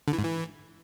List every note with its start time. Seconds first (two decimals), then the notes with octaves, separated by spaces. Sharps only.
0.08 D3
0.13 E3
0.18 G#2
0.24 E3